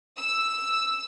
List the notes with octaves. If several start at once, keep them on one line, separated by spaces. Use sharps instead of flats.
E6